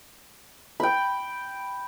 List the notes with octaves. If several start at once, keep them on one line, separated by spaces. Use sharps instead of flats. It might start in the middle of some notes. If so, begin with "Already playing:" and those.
G5 B5